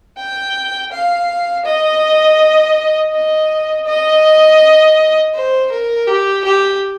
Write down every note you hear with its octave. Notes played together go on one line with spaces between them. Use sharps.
G5
F5
D#5
D#5
D#5
C5
A#4
G4
G4